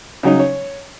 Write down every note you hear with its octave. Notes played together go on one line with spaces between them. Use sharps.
C#3 F#3 D#4
C#5